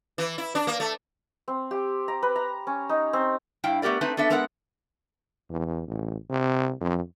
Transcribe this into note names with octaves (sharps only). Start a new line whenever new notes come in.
E3
E4
D4
A#3
A3
C4
G4
A#5
B4
A#5
C#4
D#4
C4
G2 E4 F5 G5
A3 B3 G4 A#4 D5
A3 C4 D#4 B4 A5
B3 D4 A4 E5
G#3 B3 A4 A#4 C#5 F#5
E2
A1
C3
F2